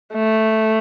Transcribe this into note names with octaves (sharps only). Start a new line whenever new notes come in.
A3